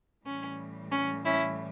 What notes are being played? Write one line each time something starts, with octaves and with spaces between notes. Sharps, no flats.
A2 E3 G3 C#4
C#4
C#4 E4